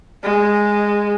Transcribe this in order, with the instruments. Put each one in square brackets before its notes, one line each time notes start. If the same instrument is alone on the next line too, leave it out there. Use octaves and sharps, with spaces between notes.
[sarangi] G#3